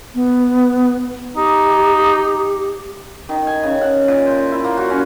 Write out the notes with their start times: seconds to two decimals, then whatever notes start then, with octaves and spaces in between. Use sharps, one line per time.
0.15 B3
1.37 D#4 G4
3.29 D#3
3.47 G#5
3.64 C#3
3.82 F#5
4.08 A#2
4.26 C5
4.52 E4
4.64 A#3
4.77 F#4
4.90 C#4